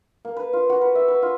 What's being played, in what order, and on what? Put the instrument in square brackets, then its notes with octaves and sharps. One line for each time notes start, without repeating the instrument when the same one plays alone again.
[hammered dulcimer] A#3
B4
F4
F#4
B4
E5
B4
F4